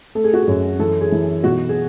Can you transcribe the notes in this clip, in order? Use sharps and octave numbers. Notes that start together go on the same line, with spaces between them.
A3 A4
G#4
F#4
G#4
F#2
E3 A4
G#4
E3
B1 F#4
G#4